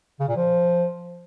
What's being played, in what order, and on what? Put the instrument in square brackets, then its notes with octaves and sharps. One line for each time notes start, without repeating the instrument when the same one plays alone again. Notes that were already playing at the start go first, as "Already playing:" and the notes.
[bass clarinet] C#3
A#2
F3